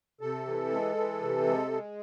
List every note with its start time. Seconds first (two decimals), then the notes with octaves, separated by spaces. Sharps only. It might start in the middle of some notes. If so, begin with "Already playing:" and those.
0.21 C3 A4
0.47 E3
0.71 G#3
0.97 E3
1.22 C3
1.47 G#3
1.72 G#3